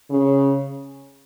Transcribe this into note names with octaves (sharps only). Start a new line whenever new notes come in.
C#3